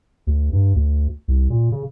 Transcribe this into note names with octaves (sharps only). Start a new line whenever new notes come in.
D2
G2
D2
C2
A#2
C#3